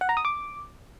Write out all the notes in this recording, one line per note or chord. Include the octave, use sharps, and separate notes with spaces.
F#5
A#5
D#6
D6